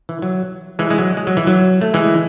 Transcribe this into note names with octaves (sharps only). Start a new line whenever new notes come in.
E3
F#3
E3 G#3
G#3
F#3
G#3
F#3
E3
F#3
A3
E3 G#3